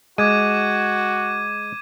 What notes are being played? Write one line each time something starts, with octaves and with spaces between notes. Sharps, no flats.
G#3 F#4 D6 G#6 D#7